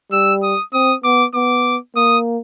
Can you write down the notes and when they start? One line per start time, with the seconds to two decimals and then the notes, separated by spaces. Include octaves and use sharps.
0.12 G3 E6
0.43 D#6
0.74 C4 D#6
1.04 B3 D6
1.34 B3 D6
1.95 A#3 D#6